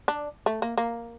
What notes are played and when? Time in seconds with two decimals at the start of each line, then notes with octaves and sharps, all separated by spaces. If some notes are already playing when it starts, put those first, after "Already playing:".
0.08 D4
0.46 A3
0.62 A#3
0.78 A#3